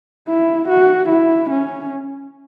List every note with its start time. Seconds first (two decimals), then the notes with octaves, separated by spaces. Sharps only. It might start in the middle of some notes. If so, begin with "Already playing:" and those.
0.28 E4
0.69 F#4
1.09 E4
1.50 C#4